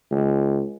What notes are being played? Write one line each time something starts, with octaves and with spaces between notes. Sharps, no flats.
C#2